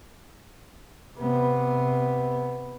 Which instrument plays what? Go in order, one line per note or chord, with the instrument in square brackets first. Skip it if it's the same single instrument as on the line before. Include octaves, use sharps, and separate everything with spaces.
[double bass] C3 B3